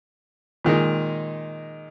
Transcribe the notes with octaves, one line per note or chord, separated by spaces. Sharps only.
A#2 D#3 G#3 D#4